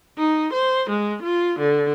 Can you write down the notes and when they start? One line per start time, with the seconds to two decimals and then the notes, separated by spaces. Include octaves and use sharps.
0.17 D#4
0.52 C5
0.89 G#3
1.21 F4
1.58 D3